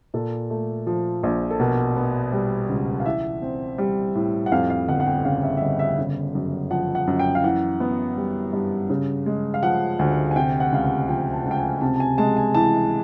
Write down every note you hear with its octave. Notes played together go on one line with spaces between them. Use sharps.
A#2 A4
A3
F3
A#1
A4
B2 A#4
B3
G3
C#2
F5
E3 E5
C4
G3
A2
F#5
F2 F5
F5
G1 F#5
F#5
G5
C#3 F5
E5
E5
G1 D#5
E5
C#3
F#2
F3 F#5
F#5
F#2
G5
F5
E3 F#5
B3
G3
G2
C#3
G#3
F5
F3 F#5
D2
G#5
C3 G5
F#5
C#2 F5
F#5
F3 G5
A5
C#2
G5
G#5
C3 A5
A5
G#5
G#3 A5
G#5
E3 A5